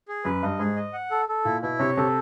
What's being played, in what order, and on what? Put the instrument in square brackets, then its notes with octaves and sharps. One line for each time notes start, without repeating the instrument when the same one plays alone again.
[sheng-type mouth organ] G#4
[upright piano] F#2 [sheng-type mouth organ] B4
[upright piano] G2 [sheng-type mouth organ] D#5
[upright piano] G#2 [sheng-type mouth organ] G#4
[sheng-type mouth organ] D#5
F#5
A4
A4
[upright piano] A#2 [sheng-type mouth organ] E4
[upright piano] B2 [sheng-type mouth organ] E4
[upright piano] C3 [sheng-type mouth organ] C#5
[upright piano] C3 [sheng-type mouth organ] A4